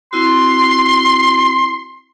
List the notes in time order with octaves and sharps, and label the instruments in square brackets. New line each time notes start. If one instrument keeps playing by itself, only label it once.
[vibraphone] C4 E4 F#4 [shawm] C6